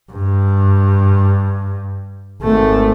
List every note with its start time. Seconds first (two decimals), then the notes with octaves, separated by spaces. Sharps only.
0.12 G2
2.42 G#1 A3